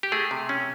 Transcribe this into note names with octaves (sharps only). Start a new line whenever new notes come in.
G4
A3 G#4
C3
C#4